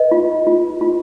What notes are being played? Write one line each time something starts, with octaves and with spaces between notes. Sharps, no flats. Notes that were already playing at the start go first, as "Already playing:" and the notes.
Already playing: B4 D#5
F4
F4
F4